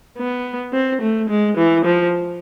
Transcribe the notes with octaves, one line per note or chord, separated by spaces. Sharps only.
B3
C4
A3
G#3
E3
F3